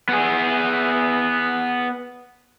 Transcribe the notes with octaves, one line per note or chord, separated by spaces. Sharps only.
B3 G#4